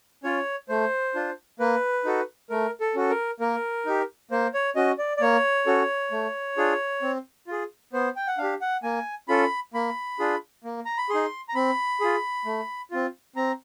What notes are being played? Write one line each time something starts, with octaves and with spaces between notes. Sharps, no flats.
C#4 F4 C#5
A3 C5
D4 F4
A#3 B4
D#4 F#4 A4
A3 A#4
A4
C#4 F#4 A4
A#4
A#3 A#4
D#4 G4
A#3 C5
C#5
C#4 F#4 D#5
D5
D5
A#3 C#5
C#4 F#4 A4
A3
D4 F4 G#4
C4
F4 G#4
B3 C5
G5
F#5
D4 F5
G4
F#5
A#3 G#5
C#4 F4 A4 B5
A#3 B5
D4 F4 G#4
A#3
A#5
B5
D#4 G#4 C6
A#5
C4 B5
F4 G#4
A3
C4 F4
C4 A#5